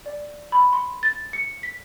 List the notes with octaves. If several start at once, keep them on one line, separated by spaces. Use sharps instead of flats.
D5
B5
C6
A6
C#7
B6